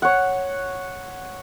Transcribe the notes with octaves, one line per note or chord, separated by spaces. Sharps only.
C#5 F#5